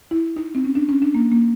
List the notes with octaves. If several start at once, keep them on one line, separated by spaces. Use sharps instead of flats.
E4
D#4
C4
C#4
D4
C#4
D4
A#3
A#3